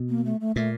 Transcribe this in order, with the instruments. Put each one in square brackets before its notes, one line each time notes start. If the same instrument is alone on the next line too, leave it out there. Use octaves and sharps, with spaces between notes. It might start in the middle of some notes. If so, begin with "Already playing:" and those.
Already playing: [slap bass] B2
[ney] A#3
A3
A3
[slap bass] A#2 [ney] A3